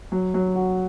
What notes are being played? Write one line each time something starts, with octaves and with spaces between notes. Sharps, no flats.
F#3
F#3
F#4